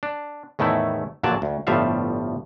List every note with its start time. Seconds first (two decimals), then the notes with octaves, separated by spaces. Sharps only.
0.03 D4
0.59 E2 A2 D#3 A3 E4
1.23 A#1 A#2 D3 F#3 D5 A5
1.42 D2
1.67 G1 A2 F3 G3 E5 F5